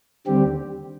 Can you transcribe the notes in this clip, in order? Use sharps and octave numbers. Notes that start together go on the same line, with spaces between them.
D#2 D3 G3 C4 G4